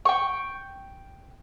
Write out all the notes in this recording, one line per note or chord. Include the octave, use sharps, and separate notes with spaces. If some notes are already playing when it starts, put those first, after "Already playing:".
G5 C#6